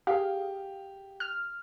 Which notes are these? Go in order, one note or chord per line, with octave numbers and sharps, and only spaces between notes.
G4 G#4 F5
F6